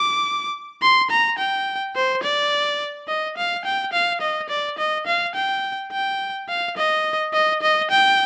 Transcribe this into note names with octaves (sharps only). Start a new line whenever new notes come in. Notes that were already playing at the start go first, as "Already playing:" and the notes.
Already playing: D6
C6
A#5
G5
C5
D5
D#5
F5
G5
F5
D#5
D5
D#5
F5
G5
G5
F5
D#5
D#5
D#5
G5